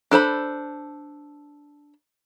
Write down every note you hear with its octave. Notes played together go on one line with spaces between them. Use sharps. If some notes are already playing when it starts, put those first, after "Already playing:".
D4 A4 C5 B5